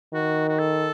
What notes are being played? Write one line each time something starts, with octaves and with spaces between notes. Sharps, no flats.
D#3 F#4
F#4
A4